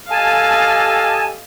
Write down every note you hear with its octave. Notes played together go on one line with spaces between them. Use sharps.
G4 A4 D#5 F5 G#5 A5